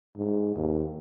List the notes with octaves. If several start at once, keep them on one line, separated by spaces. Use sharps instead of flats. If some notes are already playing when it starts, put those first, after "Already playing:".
G#2
D#2